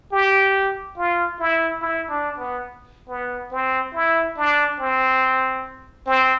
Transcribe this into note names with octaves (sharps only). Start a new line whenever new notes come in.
G4
F4
E4
E4
D4
B3
B3
C4
E4
D4
C4
C4